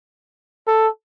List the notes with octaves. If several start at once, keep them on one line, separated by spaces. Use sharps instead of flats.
A4